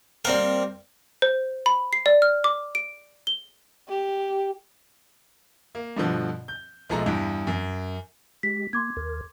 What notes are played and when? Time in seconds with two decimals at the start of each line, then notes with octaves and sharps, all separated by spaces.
0.25 G3 A#3 C4 A#4
1.22 C5
1.66 B5
1.93 C7
2.06 D5
2.22 F6
2.44 D6
2.75 D7
3.27 G7
3.88 G4
5.75 A#3
5.97 G2 B2 D3 F3
6.48 G6
6.89 B1 F3 G#3 A3 A#5
7.06 E2 G2
7.47 F#2
8.43 G#3 G4 B6
8.73 A#3 C6 D6 G#6
8.97 D#2 A#4